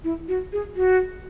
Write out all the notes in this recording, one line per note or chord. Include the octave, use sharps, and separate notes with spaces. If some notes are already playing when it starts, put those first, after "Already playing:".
E4
F#4
G#4
F#4